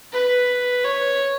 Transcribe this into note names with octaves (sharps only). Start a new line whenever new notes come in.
B4
C#5